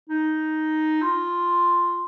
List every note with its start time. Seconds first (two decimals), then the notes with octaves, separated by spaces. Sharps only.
0.09 D#4
1.01 F4